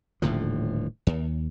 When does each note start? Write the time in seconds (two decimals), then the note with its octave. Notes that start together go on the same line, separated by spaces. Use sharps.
0.22 D#1 A2 D3 F3
1.07 D#2